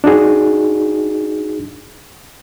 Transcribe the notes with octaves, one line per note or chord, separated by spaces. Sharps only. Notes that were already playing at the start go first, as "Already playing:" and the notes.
D4 D#4 F#4 G#4